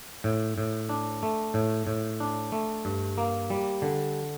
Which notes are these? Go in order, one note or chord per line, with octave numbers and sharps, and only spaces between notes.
A2
A2
D4
A3
A2
A2
D4
A3
G2
A#3
G3
D3